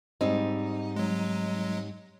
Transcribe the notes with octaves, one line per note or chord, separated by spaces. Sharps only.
G#2 G3 C4 D#4
F#3 G#3